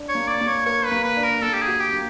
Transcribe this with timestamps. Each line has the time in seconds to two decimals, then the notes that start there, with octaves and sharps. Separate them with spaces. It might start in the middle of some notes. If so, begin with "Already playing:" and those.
Already playing: D4
0.09 C#5
0.15 A#3
0.28 D5
0.41 A#3
0.48 C#5
0.66 A#4 C#5
0.86 B4
0.91 A#3
1.04 B4
1.17 D4
1.23 A#4
1.42 A#3 A4
1.54 G4
1.61 G#4
1.67 F#4
1.80 G4
1.93 A#3